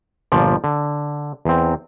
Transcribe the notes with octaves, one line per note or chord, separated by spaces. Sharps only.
G1 A#2 F3 D5
D3
E2 C4